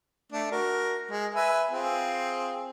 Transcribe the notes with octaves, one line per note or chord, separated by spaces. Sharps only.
A3 D4
F#4 A#4
G#3
B4 E5 G#5
C4 F4 G#4